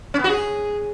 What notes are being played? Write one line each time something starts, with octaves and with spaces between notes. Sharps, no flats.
C#4
B3
F#4
G#4